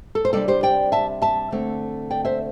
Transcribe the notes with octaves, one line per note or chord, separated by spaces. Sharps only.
A4
C5
C3 G3 D4 A4 D5
G4 C5
D5 G5
E5 A5
E5 A5
D2 D3 A3 C4
D5 G5
C5 E5